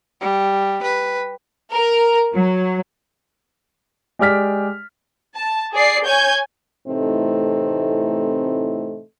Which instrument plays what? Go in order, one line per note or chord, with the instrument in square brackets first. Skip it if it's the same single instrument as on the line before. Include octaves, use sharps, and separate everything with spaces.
[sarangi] G3
B4
[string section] A#4
F#3
[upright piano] G#3 G4 D5 F6 B6
[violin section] A5
G#4 D5 C7
C#5 G#5 G6 G#6
[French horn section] A2 C3 E3 A3 C4 D#4